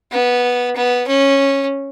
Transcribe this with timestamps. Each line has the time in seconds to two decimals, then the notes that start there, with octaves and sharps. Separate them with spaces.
0.12 B3
0.76 B3
1.08 C#4